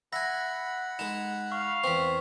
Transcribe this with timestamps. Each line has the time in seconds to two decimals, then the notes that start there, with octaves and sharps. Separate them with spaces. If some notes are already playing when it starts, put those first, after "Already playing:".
0.13 E5 F#5 G#5 B5 A#6
0.99 G#3 D#4 E7
1.52 F5 C#6
1.84 E2 C4 C#6 B6